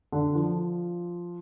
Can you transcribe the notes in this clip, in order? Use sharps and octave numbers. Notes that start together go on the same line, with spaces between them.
D3 D4
F3 F4